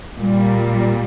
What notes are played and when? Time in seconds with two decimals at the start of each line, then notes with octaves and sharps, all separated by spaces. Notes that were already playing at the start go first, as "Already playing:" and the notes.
0.19 A#2 G3